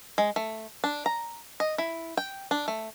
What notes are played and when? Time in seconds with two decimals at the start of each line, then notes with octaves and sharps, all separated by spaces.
0.18 G#3
0.36 A3
0.84 D4
1.06 A#5
1.60 D#5
1.78 E4
2.17 G5
2.51 D4
2.68 A3